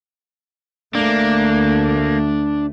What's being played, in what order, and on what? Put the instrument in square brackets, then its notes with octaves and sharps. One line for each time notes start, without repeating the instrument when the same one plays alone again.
[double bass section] D2 A3 [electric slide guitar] A#3 [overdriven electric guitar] D4